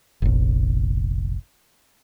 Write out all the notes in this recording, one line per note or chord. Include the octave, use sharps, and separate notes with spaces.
F1 A#1